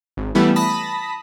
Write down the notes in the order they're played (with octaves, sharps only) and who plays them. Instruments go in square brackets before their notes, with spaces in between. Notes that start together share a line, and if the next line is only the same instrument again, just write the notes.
[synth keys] G#1
E3 G3 A3 B3 E4
A5 B5 D#6 A#6 B6